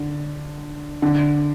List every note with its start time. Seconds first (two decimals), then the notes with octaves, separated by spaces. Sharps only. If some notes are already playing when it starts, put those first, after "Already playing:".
Already playing: D3
1.02 D3